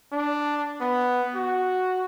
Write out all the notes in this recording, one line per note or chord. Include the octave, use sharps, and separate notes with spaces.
D4
B3
F#4